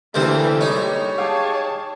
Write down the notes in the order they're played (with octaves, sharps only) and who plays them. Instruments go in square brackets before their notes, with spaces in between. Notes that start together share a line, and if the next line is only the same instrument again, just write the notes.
[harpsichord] D2 C3 C5 [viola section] E3 [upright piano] A3 A#3 A4
[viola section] G3 G#3 [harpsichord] D#4 [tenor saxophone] C#5
[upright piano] G4 F5 D6 [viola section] G#4 A5